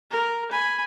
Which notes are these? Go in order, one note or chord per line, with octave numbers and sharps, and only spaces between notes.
A#4
G#5 B5